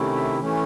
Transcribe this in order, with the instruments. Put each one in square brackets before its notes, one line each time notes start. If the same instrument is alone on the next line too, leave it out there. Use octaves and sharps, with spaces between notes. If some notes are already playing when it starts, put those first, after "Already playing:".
Already playing: [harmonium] C3 D#3 A3 C#4 E4
E5
E3 A3 C#4